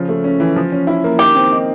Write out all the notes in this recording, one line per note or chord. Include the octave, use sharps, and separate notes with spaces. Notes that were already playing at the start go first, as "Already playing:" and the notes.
Already playing: C#3 F3
A3
C#4
E3
F3
C#4
E4
A#3
D#3 G4
C4
D#4